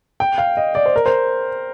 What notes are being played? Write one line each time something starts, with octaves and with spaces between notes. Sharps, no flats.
G5
F5
D#5
D5
C5
A#4
C5